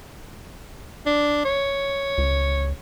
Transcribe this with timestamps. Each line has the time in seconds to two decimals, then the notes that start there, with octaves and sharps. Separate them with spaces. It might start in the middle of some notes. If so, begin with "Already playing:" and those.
1.06 D4
1.45 C#5
2.18 C#2